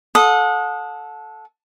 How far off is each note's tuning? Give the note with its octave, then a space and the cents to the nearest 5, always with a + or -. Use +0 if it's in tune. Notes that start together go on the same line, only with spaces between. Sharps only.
A4 -15 F#5 -35 D#6 +0